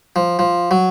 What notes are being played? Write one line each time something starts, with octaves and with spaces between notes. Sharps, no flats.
F3
F3
F#3